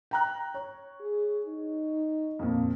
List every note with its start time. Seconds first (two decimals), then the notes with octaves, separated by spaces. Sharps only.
0.11 G5 A#5 F#6
0.54 C#5
1.01 G#4
1.46 D#4
2.39 F2 A#2